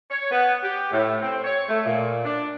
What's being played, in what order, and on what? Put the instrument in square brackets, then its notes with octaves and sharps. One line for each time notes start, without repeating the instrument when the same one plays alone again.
[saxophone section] C#5
B3
G4
A2
C4
C#5
A3
A#2
D4